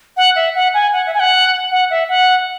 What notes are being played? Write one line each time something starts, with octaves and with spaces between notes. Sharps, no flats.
F#5
E5
F#5
G#5
F#5
E5
G#5
F#5
F#5
E5
F#5